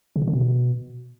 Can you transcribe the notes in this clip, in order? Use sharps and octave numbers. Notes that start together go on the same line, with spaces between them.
C#3
C3
D3
B2